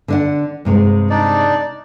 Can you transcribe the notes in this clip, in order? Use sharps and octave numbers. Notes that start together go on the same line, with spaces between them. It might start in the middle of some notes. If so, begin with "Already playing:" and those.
D3 D4 F#5
G2 C3 G#3
D4 D#4 D5